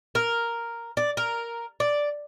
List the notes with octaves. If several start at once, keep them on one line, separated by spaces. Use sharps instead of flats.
A#4
D5
A#4
D5